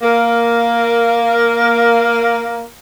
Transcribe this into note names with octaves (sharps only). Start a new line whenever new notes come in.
A#3 A#4